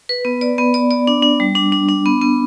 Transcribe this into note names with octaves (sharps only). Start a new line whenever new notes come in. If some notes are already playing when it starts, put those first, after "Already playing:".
B4
B3
D5
B3
D5
D5
D4
D4
G3
D4
D4
D4
B3
B3